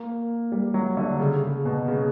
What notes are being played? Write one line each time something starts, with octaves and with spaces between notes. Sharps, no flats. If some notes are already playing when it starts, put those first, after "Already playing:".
Already playing: A#3
G3
F#3
D3
C#3
C#3
B2
C#3